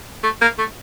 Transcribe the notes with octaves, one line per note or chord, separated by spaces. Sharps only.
A3
A#3
A3